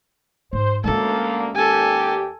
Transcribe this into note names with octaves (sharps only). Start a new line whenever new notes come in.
G#2 C5
D2 G#3 A#3 C#4 A4
D#2 G4 A4 G#5